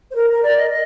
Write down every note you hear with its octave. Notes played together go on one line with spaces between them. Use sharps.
C5
A#4
A#4
D5
D#5
D#5